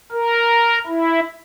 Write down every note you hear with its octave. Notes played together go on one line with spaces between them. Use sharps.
A#4
E4